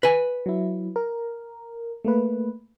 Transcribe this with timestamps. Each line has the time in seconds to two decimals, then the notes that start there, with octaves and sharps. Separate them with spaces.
0.03 B4 G#5
0.46 F#3 E4
0.96 A#4
2.04 A3 A#3 B4